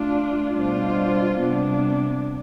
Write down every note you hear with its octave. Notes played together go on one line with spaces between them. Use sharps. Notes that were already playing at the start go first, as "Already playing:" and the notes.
Already playing: A3 D4 F4
B2 G3 D4 F4 C5
C3 G3 B3 D4